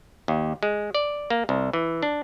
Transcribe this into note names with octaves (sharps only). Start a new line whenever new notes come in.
D#2
G#3
D5
A#3
C2
E3
D4